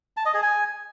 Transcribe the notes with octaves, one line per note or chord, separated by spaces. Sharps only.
A5
D#5
G#4
G#5